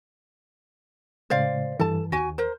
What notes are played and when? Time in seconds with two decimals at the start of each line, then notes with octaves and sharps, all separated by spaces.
1.30 A2 C#3 G#3 C5 D5 F5
1.80 G2 E3 A4 A5
2.12 D#2 F#4 G#5
2.38 A#4 C5